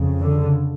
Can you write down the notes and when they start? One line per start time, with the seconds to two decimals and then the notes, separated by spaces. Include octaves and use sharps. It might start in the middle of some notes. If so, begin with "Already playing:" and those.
Already playing: F2 C#3
0.20 D3